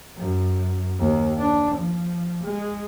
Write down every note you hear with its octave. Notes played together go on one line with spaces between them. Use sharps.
F#2
D#2
D4
F3
G#3